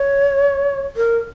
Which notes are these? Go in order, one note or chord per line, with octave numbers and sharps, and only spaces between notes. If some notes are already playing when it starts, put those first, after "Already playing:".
Already playing: C#5
A#4